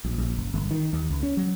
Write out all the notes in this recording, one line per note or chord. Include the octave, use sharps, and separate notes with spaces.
A#1
A#1
F#1
G1
D#3
D#2
C#2
C#4
F#3